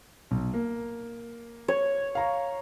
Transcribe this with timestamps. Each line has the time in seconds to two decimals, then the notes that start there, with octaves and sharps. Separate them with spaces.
0.31 B1
0.54 A#3
1.68 C#5
2.15 F5 A#5 C#6